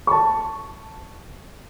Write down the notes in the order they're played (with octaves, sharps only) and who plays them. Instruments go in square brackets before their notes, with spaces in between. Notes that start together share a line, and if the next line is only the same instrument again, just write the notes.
[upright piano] A5 C#6